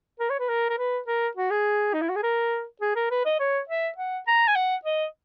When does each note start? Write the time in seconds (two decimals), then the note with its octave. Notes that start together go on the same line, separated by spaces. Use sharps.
0.20 A#4
0.30 C#5
0.40 B4
0.49 A#4
0.70 A#4
0.78 B4
1.07 A#4
1.37 F#4
1.51 G#4
1.94 D#4
2.02 E4
2.09 F#4
2.16 G#4
2.23 A#4
2.81 G#4
2.96 A#4
3.11 B4
3.25 D#5
3.40 C#5
3.69 E5
3.98 F#5
4.28 A#5
4.47 G#5
4.56 F#5
4.85 D#5